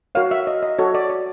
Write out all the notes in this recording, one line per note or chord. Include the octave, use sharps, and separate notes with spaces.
F#4 A#4 C#5 F5
E5
D#5
D#5
F#4 A4 C#5
D5
D5